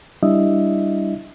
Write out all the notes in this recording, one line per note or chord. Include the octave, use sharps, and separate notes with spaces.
G3 D4 E4 D#5 E5